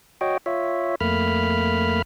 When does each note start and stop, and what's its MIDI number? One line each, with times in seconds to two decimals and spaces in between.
0.21 0.38 66
0.21 0.38 73
0.21 0.38 75
0.21 0.38 79
0.46 0.95 65
0.46 0.95 73
0.46 0.95 76
1.01 2.02 41
1.01 2.02 57
1.01 2.02 58
1.01 2.02 83
1.01 2.02 89